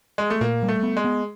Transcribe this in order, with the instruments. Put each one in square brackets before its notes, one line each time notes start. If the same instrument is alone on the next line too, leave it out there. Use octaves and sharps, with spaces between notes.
[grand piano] G#3
A3
[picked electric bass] A#2 [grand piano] A#3
[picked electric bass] G3
[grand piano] A3
[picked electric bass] B3
[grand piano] G#3
[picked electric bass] B3